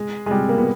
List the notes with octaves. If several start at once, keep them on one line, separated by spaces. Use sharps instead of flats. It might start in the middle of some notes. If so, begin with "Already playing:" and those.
Already playing: G#3
G#3
G3
A#3
B3